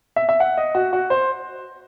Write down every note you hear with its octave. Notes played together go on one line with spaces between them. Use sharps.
E5
E5
F#5
D#5
F#4
F#4
C5